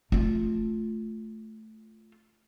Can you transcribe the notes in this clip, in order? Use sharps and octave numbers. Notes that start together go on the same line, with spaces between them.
A3 F4